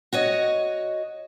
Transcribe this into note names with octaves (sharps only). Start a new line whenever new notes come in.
F#4 C#5 D#5